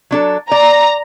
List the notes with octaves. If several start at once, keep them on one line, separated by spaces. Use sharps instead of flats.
F#3 D4 A4
D5 A#5